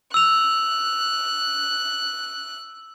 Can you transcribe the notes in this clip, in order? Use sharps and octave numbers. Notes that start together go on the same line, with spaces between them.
E6 F#6 F7